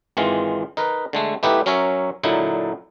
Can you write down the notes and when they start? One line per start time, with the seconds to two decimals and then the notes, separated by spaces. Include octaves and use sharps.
0.17 G#1 D#3 E3 G#3 F4
0.77 D#4 A#4 B4
1.13 D3 G#3 A3
1.43 A3 B3 D#4 E4 G4 B4
1.66 F#3 C#4 A#4 C#5 E5
2.23 A#2 D3 F#3 D#4 E4